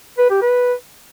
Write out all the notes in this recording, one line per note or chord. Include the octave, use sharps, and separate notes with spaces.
B4
G4
B4